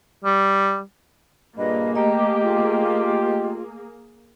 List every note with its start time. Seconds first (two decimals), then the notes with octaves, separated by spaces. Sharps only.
0.25 G3
1.58 G2 A#2 A#3 G#4 B4 D#5
1.95 A3 G4 D#5 A#5
2.43 F4